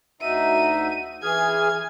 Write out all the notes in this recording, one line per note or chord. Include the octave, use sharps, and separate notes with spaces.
D2 D#4 F#4 E5 D#7
E3 G#4 G#5 F6 G#6